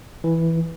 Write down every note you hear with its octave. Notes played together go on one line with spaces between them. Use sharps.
E3